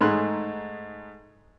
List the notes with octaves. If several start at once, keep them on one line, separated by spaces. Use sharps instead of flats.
G#2 A3 D#4 G#4 C6 F#6